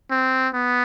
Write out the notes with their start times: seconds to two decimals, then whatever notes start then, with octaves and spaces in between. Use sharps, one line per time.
0.11 C4
0.54 B3